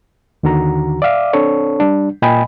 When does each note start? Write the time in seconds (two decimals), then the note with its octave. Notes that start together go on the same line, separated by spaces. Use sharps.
0.43 D#2 D3 D#3 F#4 A#5
1.02 D5 E5 F5 D6
1.33 C4 D4 A4 C#5
1.80 G3 D4
2.22 A#2 D#5 G5 G#5 B5